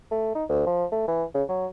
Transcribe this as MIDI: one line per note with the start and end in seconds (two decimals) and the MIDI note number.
0.11 0.34 57
0.35 0.44 63
0.49 0.62 38
0.67 0.85 53
0.92 1.03 57
1.08 1.24 52
1.35 1.43 49
1.49 1.66 54